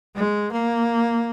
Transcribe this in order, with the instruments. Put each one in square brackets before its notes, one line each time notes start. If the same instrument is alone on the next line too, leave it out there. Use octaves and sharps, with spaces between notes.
[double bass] G#3
A#3